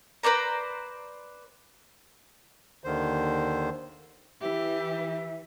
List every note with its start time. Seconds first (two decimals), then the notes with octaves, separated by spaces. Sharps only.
0.23 B4 C5 D5 A#5
2.84 D#2 D3 D#3 C5
4.41 E3 G4 E5